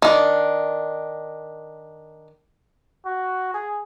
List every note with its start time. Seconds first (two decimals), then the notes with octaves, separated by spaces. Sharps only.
0.02 D#3 D4
3.06 F#4
3.54 G#4